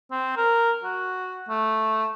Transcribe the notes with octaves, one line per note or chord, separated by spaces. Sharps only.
C4
A#4
F#4
A3